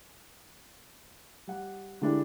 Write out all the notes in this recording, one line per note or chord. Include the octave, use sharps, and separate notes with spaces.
G3 F#5
D3 G#3 D4 E4 G4 G#4